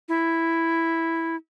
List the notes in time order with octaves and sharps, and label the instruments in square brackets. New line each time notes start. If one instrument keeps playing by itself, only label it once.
[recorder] E4